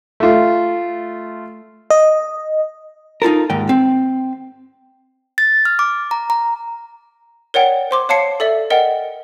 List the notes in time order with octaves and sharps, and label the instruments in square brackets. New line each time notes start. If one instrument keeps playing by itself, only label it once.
[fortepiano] A3 F4
[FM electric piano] D#5
[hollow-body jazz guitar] D#4 F4 A4 A#4
D#2 G#2 G5
C4
[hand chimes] A6
F6
D6
A#5
A#5
[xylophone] A#4 C#5 D5 F#5 G5
C5 C6 D6
C#5 F5 A5 C7 C#7
A4 D5 E5
A#4 D5 D#5 F#5 G5